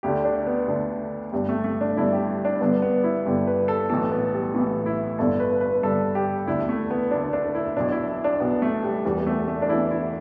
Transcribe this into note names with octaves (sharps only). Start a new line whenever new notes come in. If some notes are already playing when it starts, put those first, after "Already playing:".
D2 D3 G4
D4
B3
D2 D3
G1 G2 D3 G3
A3
A3
D4
G1 G2 D3 E4
G4
D4
G1 G2 D3 B3
B3
E4
G1 G2 D3 G4
B4
A4
B1 A2 E3 A4
B3
G3
B1 A2 E3 B3
E4
G1 G2 D3 A4
B4
B4
G1 G2 D3 A4
G4
E1 D2 D3 E4
A3
B3
E1 D2 D3 D4
D4
E4
B1 B2 D4
E4
E4
D4
B1 B2 B3
A3
G3
E1 E2 E3 G3
A3
A3
D4
E1 E2 E3 E4
E4